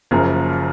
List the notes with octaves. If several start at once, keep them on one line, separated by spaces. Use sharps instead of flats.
F#1 F#2 C#3 F3 A#3